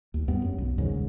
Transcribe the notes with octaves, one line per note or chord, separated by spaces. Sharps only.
D#2
E2 G2 B3
F#2
B1
D#1 D#2 G#2 C#3